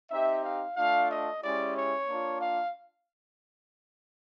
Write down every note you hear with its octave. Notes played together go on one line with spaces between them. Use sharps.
C4 D#4 G4 E5
F5
A3 D4 F4 F5
D#5
G#3 C#4 E4 G4 D5
C#5
A#3 D4 F4
F5